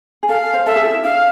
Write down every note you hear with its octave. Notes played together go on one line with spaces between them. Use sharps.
G#4
A4 F5
C5
A4 E5
G#4
F4
E4
D4 F5